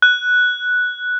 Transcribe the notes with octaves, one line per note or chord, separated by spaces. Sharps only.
F#6